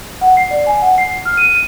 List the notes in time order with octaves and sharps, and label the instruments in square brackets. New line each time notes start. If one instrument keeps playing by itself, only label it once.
[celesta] F#5
C7
D5
G#5
F#5
C7
F6
D#7